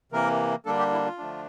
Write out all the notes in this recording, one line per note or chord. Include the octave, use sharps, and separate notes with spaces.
C3 E3 A#3 A#4
D3 G3 A#3 D4 A4
G4
E4
F4
D3 F3 A3 D4